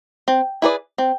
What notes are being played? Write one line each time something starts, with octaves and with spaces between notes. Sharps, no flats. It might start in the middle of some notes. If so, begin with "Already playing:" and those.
C4
E4 G#4 B4 D5
C4